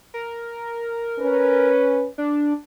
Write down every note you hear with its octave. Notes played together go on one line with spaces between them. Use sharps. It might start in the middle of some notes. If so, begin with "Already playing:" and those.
A#4
C#4 B4
D4